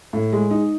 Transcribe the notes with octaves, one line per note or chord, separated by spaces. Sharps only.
A2
G#3
D#4